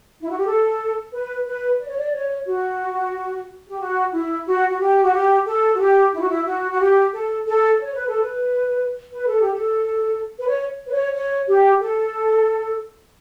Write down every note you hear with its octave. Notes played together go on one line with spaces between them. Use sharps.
E4
F#4
G4
A4
B4
B4
D5
C#5
D5
C#5
F#4
G4
F#4
E4
F#4
F#4
G4
F#4
G4
A4
F#4
G4
E4
F#4
E4
F#4
F#4
G4
A4
A4
C#5
B4
A4
B4
B4
A4
G4
A4
B4
C#5
B4
C#5
C#5
G4
A4